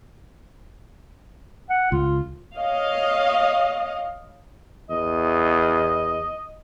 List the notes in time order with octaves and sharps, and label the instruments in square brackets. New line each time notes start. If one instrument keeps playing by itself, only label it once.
[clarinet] F#5
[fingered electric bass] C#2 [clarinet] F4
[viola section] C#5 D#5 F5
[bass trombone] E2 [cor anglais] D#5